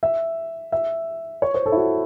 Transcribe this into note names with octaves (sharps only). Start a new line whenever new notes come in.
E5
E5
C#5
C5
A4
E4
F#4